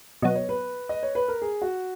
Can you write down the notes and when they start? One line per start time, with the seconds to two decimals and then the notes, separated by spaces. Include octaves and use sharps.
0.22 B2 F#3 B3 D#5
0.35 C#5
0.49 B4
0.89 D#5
1.03 C#5
1.15 B4
1.28 A#4
1.42 G#4
1.62 F#4